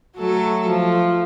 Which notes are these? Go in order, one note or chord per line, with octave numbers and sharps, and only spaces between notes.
F#3 A3 A4
F3